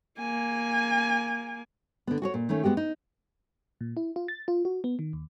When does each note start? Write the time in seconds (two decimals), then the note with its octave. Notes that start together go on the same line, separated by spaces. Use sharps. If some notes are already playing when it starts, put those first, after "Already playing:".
0.18 A#3 G#5
2.07 D3 B3
2.22 F#4 G#4 C#5
2.34 A#2
2.49 D#3 A3 C#4
2.64 G#3 A3 B3 F#4 G4
2.77 D#4
3.81 A#2
3.97 E4
4.16 F4
4.28 A6
4.48 F4
4.65 F#4
4.84 B3
4.99 D#3
5.13 D#2